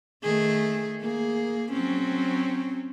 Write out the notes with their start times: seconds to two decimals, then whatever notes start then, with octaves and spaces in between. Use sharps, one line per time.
0.23 D#3 A3 G#4
1.01 A#3 G#4
1.72 F#3 C4 C#4